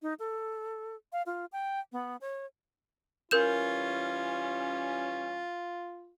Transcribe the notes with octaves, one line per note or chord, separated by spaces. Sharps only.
D#4
A4
F5
F4
G5
B3
C#5
E3 G3 C#4 F4 A#4 G6 E7